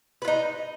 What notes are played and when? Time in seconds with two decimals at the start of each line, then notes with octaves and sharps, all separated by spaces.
0.22 B4
0.25 F4
0.28 D#4